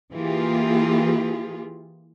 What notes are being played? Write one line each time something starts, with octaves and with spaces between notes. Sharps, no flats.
E3 A#3 F4 G4 G#4